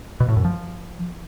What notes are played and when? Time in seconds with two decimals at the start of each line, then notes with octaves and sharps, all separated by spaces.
0.20 B2
0.28 A2
0.36 F#2
0.45 F3